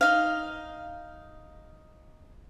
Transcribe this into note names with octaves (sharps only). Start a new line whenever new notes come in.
D#4 F5